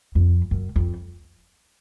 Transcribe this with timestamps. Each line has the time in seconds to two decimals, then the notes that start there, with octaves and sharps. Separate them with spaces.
0.15 F2
0.51 F#2
0.76 F2